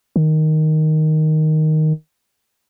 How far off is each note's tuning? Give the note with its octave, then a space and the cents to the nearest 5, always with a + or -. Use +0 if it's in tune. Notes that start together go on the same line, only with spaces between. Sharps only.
D#3 +0